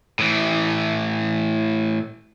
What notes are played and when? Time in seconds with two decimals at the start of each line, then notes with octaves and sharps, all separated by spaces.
0.19 A2 E3